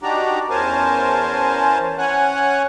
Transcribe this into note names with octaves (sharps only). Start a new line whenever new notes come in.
D4 D#4 F#4 G4 D5 A#5
E2 C#4 A#4 C5 G#5 A5
C#4 C#5 F#5 G#5 F#6